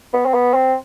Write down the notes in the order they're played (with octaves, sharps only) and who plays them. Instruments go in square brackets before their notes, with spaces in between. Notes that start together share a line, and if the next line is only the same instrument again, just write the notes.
[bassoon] B3
C4
B3
C4